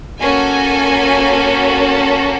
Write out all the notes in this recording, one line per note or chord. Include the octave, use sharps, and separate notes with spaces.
A#3 C#4 F#4 A4 G#5
A5